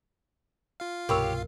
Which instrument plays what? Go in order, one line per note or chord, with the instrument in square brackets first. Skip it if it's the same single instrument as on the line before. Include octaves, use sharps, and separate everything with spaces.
[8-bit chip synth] F4 F5
[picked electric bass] C2 G2 B2 [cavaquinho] G4 C#5 [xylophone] A#4 B5 E6